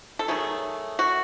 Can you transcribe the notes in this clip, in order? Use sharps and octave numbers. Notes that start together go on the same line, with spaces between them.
A4
D#3 F#3 A3 G#4
F#4